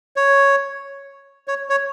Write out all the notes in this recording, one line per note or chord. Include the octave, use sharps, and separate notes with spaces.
C#5
C#5
C#5